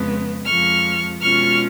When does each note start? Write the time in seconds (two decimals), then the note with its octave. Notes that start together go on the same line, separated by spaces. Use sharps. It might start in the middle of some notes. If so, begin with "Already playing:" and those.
Already playing: F2 C#3 F3 G#3 B3
0.46 F2 F3 G#3 C#6 F6
1.22 B2 G#3 C#4 F4 C#6 F6